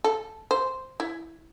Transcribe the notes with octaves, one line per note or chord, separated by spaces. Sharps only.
A4
C5
E4